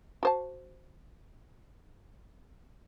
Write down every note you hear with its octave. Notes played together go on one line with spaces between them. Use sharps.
F#4 C5 A5